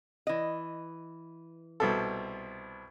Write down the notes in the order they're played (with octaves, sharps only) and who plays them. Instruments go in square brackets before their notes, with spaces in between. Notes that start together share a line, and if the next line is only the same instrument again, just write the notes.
[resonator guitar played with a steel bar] E3 D#5
[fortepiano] C2 B2 A4